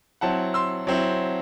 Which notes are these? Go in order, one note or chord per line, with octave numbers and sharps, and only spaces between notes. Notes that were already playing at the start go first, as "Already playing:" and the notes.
F#3 C4 E4 F#5 A5
C6 E6
F#3 C4 E4